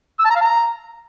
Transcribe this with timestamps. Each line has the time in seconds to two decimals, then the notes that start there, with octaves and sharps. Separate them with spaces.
0.19 E6
0.25 A5
0.30 A#5
0.35 F5
0.41 A#5